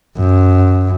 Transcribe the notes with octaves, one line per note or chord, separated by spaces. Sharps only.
F#2